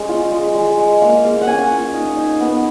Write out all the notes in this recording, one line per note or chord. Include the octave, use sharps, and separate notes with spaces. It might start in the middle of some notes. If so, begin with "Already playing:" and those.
Already playing: G#3 C#4
F4
G#3
G#3
G#3
A#3 F5
A#3 F5
F#5
C#4 G#5
F4
D#4
D#4
B3